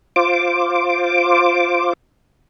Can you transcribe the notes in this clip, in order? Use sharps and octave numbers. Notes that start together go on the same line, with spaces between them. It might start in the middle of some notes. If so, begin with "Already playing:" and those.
F4 C5 D6